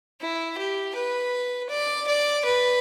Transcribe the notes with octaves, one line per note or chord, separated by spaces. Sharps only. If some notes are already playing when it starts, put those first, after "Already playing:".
E4
G4
B4
D5
D5
B4